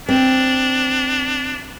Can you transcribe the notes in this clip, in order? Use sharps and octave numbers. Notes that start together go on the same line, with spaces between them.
C4 D4